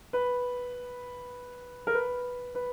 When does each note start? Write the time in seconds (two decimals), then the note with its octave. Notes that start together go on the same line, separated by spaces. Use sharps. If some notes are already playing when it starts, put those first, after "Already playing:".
0.13 B4
1.87 A#4
1.94 B4
2.55 B4